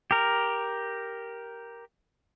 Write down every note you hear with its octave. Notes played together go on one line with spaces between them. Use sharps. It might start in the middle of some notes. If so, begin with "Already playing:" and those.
G4 A#4